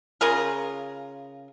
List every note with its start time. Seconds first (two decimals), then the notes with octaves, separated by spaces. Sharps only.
0.21 C#3 F4 G#4 A#4